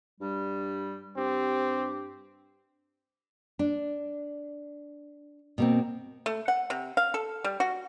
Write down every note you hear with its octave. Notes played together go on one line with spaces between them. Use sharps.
G2 G3
G2 C4 G4
D4
B2 A#3 C4
A3
F#5
C3
F5
A4
G3
F#4